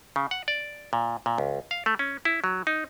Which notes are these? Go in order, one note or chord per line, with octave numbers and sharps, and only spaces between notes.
C#3
F#5
D5
A#2
A#2
C#2
F5
A3
C#4
E4
F#3
D#4